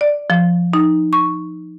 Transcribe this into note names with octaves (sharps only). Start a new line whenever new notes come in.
D5
F3
D#4
C#6